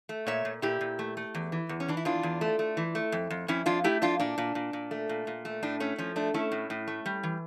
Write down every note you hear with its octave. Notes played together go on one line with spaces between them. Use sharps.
A3
A#2 C#5 E5
A#2
A#2 E4 G4
A#2
A3
A3
E2
E3
E2
C#4
E3 D4
E4
E2 D4 F4
E2
A3
A3
E3
A3
F2
F2
F2 C#4 E4
F2 D4 F4
A3 E4 G4
F2 D4 F4
A#2 D4
A#2
A#2
A#2
A3
A#2
A#2
A3
A2 D4
A3 C#4
F3 C#4
A3 D4
A3 C#4 E4
A2
A2
A3
G3
E3